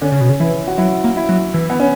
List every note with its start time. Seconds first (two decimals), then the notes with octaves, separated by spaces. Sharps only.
0.01 D3 C#4
0.12 C#3
0.21 B2
0.30 C#3
0.40 E3 E4
0.68 F#4
0.78 F#3 E4
1.04 A#3
1.17 E4
1.29 F#3
1.54 E3
1.70 B3
1.80 C#4